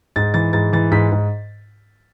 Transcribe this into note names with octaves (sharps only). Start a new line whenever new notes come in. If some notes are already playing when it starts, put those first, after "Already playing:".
G#2 A6
E3 A6
G#2 A6
E3 A6
G#2 B6
G#2